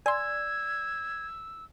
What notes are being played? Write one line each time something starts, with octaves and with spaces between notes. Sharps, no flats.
D5 G#5 C6 E6 G#6